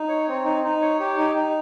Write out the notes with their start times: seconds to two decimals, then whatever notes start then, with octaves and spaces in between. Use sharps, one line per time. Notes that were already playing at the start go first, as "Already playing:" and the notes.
Already playing: D#4
0.09 C#5
0.28 C4
0.45 D#4
0.63 D#4
0.82 C#5
1.00 G4
1.17 D#4
1.35 D#4